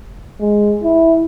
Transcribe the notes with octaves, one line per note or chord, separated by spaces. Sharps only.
G#3
E4